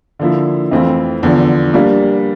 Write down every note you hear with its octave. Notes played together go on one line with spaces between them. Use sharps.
D3 F3 A#3 E4
F2 E3 A3 C4 F4
E2 D3 F3
G3 A#3 D4